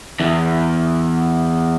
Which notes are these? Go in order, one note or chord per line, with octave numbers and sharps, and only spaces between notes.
E2